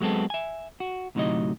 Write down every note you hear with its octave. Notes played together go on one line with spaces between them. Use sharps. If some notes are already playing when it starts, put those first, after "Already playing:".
F#3 G#3 B3 C4 A4
E5 G#5
F#4
D2 A2 C3 F#3 D#4 D#5